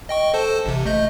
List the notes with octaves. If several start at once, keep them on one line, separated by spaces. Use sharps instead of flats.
D#5 G5 C#6
A4 C5 A5
A1 C3
A3 D#5 G6